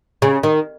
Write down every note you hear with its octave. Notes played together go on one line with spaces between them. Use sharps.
C#3
D#3